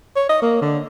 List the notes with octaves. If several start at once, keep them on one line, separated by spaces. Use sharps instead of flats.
C#5
D#5
A#3
D3